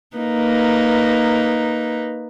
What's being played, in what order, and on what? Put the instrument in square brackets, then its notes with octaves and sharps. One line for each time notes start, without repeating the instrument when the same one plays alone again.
[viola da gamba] A#3 D#4 B4